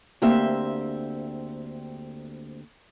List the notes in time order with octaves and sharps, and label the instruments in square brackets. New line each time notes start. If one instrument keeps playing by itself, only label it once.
[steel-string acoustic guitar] D2 A#3 C4 G4 E5